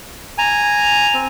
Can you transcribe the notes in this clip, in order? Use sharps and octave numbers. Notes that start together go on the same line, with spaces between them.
G#5 A#5
C4